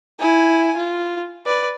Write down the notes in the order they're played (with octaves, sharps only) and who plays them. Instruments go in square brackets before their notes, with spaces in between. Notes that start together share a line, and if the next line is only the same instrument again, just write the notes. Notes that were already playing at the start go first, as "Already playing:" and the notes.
[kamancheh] E4 G#5
F4
B4 D5